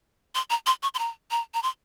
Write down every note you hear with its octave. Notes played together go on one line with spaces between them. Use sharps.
C6
A#5
C6
C#6
C6
A#5
A#5
A#5
C6